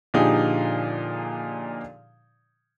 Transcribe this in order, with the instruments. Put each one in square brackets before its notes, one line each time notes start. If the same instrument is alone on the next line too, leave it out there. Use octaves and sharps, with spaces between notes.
[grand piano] A#2 D3 F3 D#4 G4 G#4